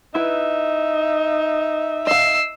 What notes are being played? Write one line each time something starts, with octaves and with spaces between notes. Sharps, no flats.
D#4 E4 B4 E5
D#5 F5 E6 C7